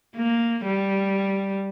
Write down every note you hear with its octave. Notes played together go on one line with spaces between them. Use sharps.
A#3
G3